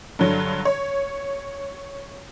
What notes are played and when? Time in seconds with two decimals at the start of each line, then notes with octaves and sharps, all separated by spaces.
0.19 G2 D3 F#3
0.65 C#5